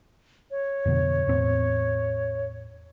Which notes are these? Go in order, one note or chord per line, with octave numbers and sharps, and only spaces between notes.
C#5
F2 B2 D3
E2 A2 C4